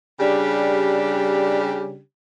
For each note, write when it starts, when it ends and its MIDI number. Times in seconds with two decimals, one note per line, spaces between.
0.19 1.99 49
0.19 1.99 55
0.19 1.99 62
0.19 1.99 67